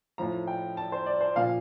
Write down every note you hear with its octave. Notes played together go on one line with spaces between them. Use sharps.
A2 F3 A#5
G5
A5
C5
D5
C5
A#2 F3 F5